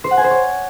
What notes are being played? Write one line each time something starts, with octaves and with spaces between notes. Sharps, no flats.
C5
F#5
G#5
C5
C#5